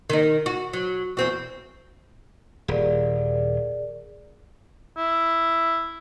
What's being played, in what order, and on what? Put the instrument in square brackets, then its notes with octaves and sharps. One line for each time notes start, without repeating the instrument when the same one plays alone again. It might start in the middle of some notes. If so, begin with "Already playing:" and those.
[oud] D#3 D#4
F#4
F#3
E2 C4 F#4
[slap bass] D#1 [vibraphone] G#4 A#4 D5
[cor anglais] E4